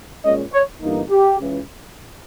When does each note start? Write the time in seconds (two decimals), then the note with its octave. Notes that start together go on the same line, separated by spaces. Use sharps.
0.25 A#2 G#3 C#4 D#5
0.53 C#5
0.82 G1 G2 E3 A#3 D#4
1.11 G4
1.39 C#2 C#3 E3